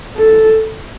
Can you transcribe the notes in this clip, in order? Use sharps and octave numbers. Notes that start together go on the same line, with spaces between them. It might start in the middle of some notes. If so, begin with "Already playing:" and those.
A4